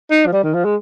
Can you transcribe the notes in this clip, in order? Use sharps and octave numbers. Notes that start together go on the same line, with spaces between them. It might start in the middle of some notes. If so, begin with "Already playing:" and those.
D#4
F3
G3
D#3
F3
G#3